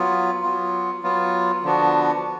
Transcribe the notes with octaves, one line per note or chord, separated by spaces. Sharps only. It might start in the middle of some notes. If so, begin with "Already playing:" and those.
Already playing: F#3 B3 F4
F#3 B3 F4
F#3 B3 F4
D3 F3 B3 D4 F#4